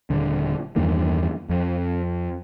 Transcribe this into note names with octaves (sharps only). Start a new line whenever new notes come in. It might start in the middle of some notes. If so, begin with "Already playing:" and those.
D#1 D3
E2 G2 D#3 A#3
F2